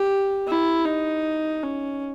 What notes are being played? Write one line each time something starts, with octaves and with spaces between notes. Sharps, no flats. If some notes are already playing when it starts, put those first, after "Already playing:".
Already playing: G4
E4
D#4
C#4